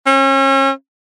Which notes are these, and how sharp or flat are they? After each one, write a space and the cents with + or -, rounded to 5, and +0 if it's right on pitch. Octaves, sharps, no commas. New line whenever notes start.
C#4 -35